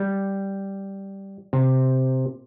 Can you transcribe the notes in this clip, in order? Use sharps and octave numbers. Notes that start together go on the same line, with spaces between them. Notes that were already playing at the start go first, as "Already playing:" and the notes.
Already playing: G3
C3